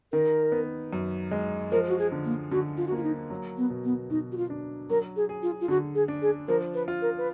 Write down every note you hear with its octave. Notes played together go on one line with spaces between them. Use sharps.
D#3 A#4
B3
F#2
G#3
F3 A#4
F#4
G#4
D3
A#3
D3 F#4
F4
F#4
A#3 F4
D#4
F#3
B3
B2
B3
B2 D#4
F#4
F4
D4
F#3 A#4
G#4
G#4
F4
F4
D3 F#4
G#4
D4
G#4
F3 A#4
B4
F4
A#4
B4